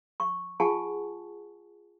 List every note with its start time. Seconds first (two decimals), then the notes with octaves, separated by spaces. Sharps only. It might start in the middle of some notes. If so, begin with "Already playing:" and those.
0.20 C#6
0.60 F4 G#4 F#5 G#5 A5 C#6